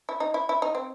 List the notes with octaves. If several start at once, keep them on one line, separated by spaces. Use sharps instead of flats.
E4
D#4
E4
E4
D#4
C4